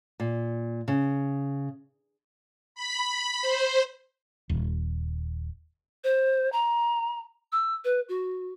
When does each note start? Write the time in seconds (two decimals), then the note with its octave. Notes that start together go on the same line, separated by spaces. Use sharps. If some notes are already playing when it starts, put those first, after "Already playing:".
0.20 A#2
0.88 C#3
2.75 B5
3.42 C5
4.49 D#1
6.04 C5
6.52 A#5
7.52 E6
7.85 B4
8.09 F#4